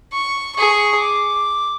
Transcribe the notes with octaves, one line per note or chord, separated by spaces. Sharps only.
C#6
G#4 C#6
D6